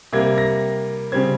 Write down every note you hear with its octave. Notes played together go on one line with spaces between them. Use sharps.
C3 G3 A#3 G#6
A#6
C#3 G3 C4 G#6